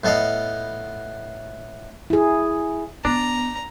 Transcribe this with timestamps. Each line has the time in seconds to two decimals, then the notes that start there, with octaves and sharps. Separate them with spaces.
0.04 A2 B3 A4 D#5 F5
2.10 E4 G#4
3.05 B3 D4 A#5